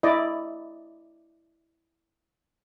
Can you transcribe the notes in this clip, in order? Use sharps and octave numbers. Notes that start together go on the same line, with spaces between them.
E4 D5 D#5